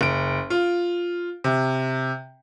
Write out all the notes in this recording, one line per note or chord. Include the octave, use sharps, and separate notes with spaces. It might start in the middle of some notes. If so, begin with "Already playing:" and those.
F#1 D7
F4
C3